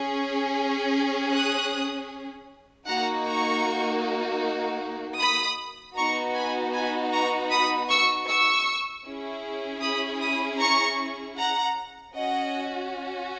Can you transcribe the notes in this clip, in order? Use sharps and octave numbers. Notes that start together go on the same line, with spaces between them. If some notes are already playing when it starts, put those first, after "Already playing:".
Already playing: C#4 G#4
D#6 F#6
A#3 D#4 F#4 F#5 A#5
A#5 C#6
B5 D#6
B3 D#4 F#4 A#5 C#6
G#5 B5
G#5 B5
A#5 C#6
B5 D#6
C#6 E6
C#6 E6
C#4 E4 G#4
B5 D#6
B5 D#6
A#5 C#6
F#5 A#5
C#4 F#4 D#5 F#5